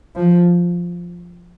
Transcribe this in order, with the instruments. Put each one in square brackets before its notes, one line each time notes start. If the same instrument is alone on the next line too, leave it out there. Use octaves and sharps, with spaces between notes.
[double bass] F3